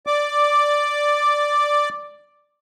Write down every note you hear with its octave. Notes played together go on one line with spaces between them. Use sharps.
D5 D6